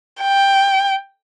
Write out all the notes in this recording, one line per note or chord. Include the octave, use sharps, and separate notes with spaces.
G5